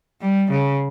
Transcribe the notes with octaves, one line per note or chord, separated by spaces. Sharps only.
G3
C#3